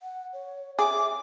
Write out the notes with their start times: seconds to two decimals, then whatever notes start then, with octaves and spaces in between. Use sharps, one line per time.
0.01 F#5
0.33 C#5
0.79 G#4 E5 D6